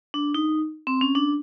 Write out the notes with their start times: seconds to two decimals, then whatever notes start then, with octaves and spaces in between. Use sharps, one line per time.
0.14 D4
0.34 D#4
0.87 C4
1.01 C#4
1.15 D4